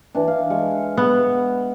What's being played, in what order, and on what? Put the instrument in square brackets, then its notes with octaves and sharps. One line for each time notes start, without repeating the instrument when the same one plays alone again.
[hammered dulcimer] E3 D4
F5
G#3 C#6
[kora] B3